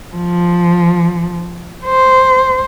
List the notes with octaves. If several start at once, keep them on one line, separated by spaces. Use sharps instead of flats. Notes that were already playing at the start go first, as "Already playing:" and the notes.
F3
C5